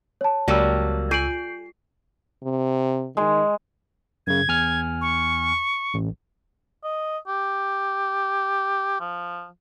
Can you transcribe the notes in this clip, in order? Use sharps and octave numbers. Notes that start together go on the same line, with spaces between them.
C#5 A5
C#2 F#3 G3 A#3 D5 G5 E6
F4 G#5 G6 C7 D7 F#7
C3
D#3 G#3
F#2 C#3 G#6
E2 G#5 F6
C#6
A1
D#5
G4
F3